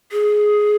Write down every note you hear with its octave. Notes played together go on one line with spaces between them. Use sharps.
G#4